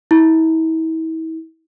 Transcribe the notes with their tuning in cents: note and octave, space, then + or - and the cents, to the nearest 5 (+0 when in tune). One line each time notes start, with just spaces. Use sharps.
E4 -40